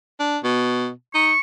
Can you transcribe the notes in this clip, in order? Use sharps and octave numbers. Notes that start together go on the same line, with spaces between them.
D4
B2
D#4 C#6